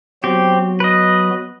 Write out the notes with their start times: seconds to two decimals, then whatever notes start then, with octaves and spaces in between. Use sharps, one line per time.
0.24 F#3 B3 C4 F#4 G4
0.80 B4 D#5